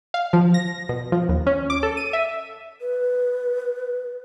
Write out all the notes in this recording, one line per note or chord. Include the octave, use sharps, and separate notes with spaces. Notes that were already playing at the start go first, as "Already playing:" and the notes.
F5
F3
A#6
B2
F3
D#2
C#4
D6
A4
D#7
E5
B4